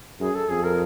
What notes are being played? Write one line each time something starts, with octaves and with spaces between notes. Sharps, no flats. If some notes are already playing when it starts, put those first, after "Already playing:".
F#2 G#4
A4
F2 G#4
A#4